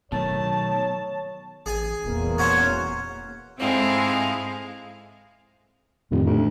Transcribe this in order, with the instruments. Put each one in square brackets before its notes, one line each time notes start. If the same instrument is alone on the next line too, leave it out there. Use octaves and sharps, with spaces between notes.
[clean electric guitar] B2 D#3 A3 [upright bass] F#3 [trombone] C#5 [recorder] A5
[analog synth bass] A1 [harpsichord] G#4 G#5
[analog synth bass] D#1 [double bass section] E2 A#3
[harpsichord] C#4 F#4 C5 [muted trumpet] C#5
[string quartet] G#2 G#3 F5 [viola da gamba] C4 E4 A4
[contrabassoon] F1 [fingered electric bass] F2 A2 D#3
[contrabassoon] D2